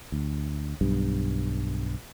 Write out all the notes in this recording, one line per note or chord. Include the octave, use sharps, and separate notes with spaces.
D2
B1 G2